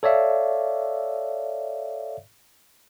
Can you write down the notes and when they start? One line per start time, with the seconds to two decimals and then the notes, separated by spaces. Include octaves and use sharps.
0.03 A4 C#5 D5 E5 F5